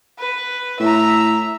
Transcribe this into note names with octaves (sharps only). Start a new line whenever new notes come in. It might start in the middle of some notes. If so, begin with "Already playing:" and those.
B4
A2 E5 A#5